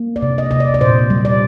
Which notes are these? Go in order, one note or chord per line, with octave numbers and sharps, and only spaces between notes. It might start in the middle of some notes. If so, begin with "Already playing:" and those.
Already playing: A#3
D5
C3
D#5
C3 D#5
D5
D5
A#2 C5
G3
D5